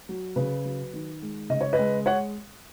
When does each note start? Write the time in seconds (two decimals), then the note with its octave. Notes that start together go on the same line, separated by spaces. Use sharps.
0.09 F#3
0.36 C#3 B4
0.65 F#3
0.93 D#3
1.22 G#3
1.50 C#3 D#5
1.61 C#5
1.73 B4 D#5
1.79 G#3
2.06 C#5 F#5